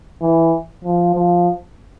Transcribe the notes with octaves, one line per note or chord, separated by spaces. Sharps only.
E3
F3
F3